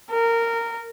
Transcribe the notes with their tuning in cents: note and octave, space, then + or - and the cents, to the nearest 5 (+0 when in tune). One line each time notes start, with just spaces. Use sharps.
A#4 -15